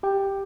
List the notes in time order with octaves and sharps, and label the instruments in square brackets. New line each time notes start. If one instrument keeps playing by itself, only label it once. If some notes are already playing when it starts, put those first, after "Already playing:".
[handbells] G4 G5